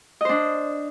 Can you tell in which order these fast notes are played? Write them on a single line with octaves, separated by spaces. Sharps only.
D#5 C5 D4